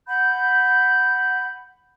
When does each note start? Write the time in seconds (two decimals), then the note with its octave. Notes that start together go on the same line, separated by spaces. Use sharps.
0.07 F#5 B5 G6